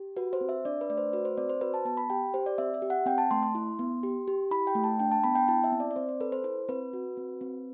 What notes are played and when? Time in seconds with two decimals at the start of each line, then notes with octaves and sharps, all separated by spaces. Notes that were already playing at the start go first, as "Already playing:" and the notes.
Already playing: G4
0.16 F#4 B4
0.33 C5
0.41 C4
0.49 E5
0.65 D4 D5
0.81 B4
0.90 A3 D5
0.97 C5
1.13 F#4 B4
1.25 C5
1.37 C4 D5
1.49 C5
1.61 F#4 B4
1.74 A5
1.85 B3 A5
1.97 B5
2.10 G4 G5
2.34 G4 C5
2.46 D5
2.58 C4 E5
2.74 E5
2.82 G4
2.90 F#5
3.06 C4 G5
3.18 A5
3.31 A3 C6
3.43 C6
3.55 E4
3.79 B3
4.03 G4
4.28 G4
4.51 E4 B5
4.67 G5
4.75 A3
4.84 A5
4.99 D4 G5
5.12 A5
5.24 B3 B5
5.35 G5
5.48 E4 A5
5.64 E5
5.72 C4
5.80 D5
5.91 D5
5.96 C4 C5
6.09 C5
6.20 A4 B4
6.32 C5
6.44 E4 C5
6.69 C4 B4
6.93 F#4
7.17 C4
7.41 C4